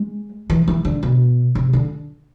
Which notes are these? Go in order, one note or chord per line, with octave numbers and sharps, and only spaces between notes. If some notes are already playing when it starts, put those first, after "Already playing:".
Already playing: G#3
E3
E3
D3
B2
C3
D3